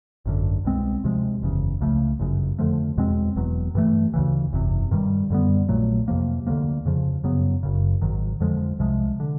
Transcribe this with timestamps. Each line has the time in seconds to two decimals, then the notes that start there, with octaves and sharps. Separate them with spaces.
0.26 G#1 F#2 D3
0.64 C2 B2 G#3 C4
1.04 D2 C3 F3 G#3
1.43 F#1 E2 C#3
1.81 C#2 C#3 F3 A3
2.19 G1 F#2 C#3
2.59 F2 D3 F3 A3
2.98 E2 B2 G#3 C4
3.36 E1 E2 B2 F#3
3.75 G2 E3 A3
4.14 D2 C#3 E3
4.53 F#1 E2 C3
4.91 G2 D#3 G3
5.30 F#2 D3 G3 B3
5.69 A#1 A#2 F#3 A3
6.08 F2 C3 F3 A#3
6.47 D2 D3 F3 A#3
6.85 F2 C#3 F3
7.24 F#2 C#3 F#3 B3
7.63 F#1 F#2 C#3
8.01 G#1 G#2 D#3 F#3
8.40 F2 D3 F3 G#3
8.79 C2 C3 F3 G#3
9.20 D3